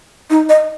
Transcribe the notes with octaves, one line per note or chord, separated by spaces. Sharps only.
D#4
D#5